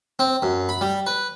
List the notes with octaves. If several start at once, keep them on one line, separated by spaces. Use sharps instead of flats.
C4
F#2
B5
G3
B4